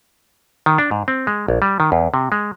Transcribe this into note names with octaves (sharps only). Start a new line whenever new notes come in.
D#3
D4
G#2
C4
G#3
A#1
G3
D#3
E2
C3
G#3